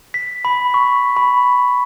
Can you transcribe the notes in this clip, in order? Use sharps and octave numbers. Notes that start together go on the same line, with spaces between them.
B6
B5
C#6
B5